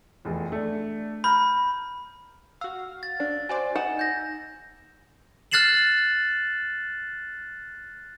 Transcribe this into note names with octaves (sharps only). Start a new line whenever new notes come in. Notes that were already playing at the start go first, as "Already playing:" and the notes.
F1 E2
A3 D4
A#5 B5 F6 G6
F#4 F5 E6
A6
D4
F#4 C5 D5 G#5
D#4 F#5 E7
G6 A#6
F6 F#6 A6 C7 E7 F#7